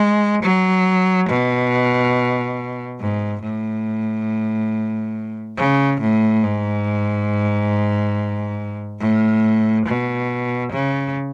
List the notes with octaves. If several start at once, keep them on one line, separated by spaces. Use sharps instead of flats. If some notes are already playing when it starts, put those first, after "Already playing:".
Already playing: G#3
F#3
B2
G#2
A2
C#3
A2
G#2
A2
B2
C#3